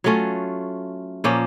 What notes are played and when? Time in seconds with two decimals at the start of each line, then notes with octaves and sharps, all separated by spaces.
0.04 F#3 A3 C#4 F4
1.24 A#2 F3 A#3 C#4